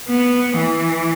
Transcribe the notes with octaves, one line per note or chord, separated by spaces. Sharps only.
B3
E3